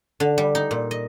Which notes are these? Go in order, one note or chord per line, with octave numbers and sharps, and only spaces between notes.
D3
G3
D#4
A#2
D#5